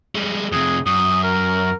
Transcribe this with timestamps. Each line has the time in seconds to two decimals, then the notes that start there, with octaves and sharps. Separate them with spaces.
0.15 G3 G#3
0.52 F2 C3 G#4
0.86 F#2 D#6
1.24 A#4